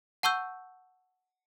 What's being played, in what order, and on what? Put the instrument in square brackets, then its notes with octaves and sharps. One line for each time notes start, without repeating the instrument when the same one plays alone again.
[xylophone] F#5 A5 C#6 E6 G6